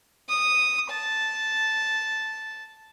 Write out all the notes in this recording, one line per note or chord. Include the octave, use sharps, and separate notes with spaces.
D#6
A5